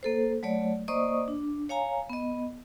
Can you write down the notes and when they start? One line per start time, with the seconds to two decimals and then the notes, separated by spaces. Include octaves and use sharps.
0.03 A#3 A4 C5
0.43 F#3 A3 C#5 D5
0.88 A#3 C5 D5 D#5 C#6 D#6
1.28 D4
1.69 C#5 F5 G#5 A#5
2.10 B3 D#5